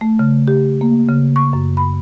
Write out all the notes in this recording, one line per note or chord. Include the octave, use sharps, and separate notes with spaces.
A3
C#3
G4
A#3
C#3
C#6
F#2
B5